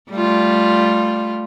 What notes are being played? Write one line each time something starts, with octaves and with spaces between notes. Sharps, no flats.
G3 A3 F4